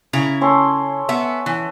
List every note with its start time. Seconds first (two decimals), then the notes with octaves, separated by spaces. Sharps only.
0.13 C#3 E4 A#5
0.41 C#4 A4 C6
1.09 B3 E5
1.46 E3